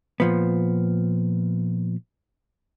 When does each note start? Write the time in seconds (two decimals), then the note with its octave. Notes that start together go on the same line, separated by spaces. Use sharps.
0.20 A#2 F3 B3